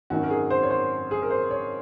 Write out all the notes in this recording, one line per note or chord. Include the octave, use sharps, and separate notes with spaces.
G#1 F#2 D#3 F#4
A#4
G#4
C5
C#5
C5
G#4
A#4
C5
C#5